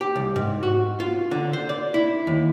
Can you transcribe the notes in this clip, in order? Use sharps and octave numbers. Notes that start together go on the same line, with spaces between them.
G4
C2
G#2
F#4
F4
D3
C5
D5
E4
D#2